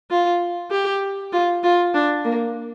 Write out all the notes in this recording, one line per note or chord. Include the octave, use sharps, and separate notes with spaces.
F4
G4
F4
F4
D4
A#3